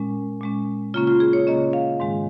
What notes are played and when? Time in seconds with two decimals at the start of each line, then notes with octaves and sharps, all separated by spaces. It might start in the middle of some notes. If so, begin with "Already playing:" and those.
Already playing: A#2 G#3 C#4
0.41 A#2 G#3 C#4
0.94 C#3 A#3 C#4 F4
1.07 F4
1.20 G#4
1.33 C#5
1.47 C#3 A#3 C#4 D#5
1.73 F5
2.00 G#2 D#3 G#3